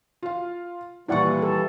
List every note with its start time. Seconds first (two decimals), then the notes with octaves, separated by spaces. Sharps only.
0.23 F4 F5
1.08 D#2 A#2 E3 G3 E4 D5 F#5 C#6
1.42 A4